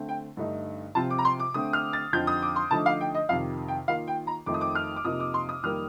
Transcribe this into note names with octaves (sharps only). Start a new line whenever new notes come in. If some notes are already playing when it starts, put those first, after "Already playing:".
Already playing: D3 A3 C4
G5
G2 D3 A3 D#4
C3 F3 C4 F4 A5
D6
A#5
C6
D6
D3 A3 C4 D#6
F6
A6
F2 D3 F3 C4 D#4 G6
D#6
D6
C6
D3 F3 A3 D#4 A5
F5
G5
D#5
F2 C3 D#3 F5
G5
D#3 A#3 F4 F5
G5
A#5
F2 D#3 A3 C4 D#4 D6
D#6
D6
F6
D6
F2 C3 F3 A#3 D#4 D#6
D6
C6
D#6
F2 D#3 G3 A#3 F6